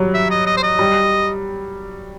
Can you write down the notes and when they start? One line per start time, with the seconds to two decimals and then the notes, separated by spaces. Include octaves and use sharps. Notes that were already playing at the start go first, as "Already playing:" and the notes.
Already playing: F#3 G3
0.14 E5
0.31 D#5
0.47 D#5
0.57 C5
0.63 D#5
0.79 G3